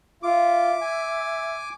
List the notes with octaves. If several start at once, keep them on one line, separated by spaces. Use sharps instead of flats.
F4 E5 D6
G#5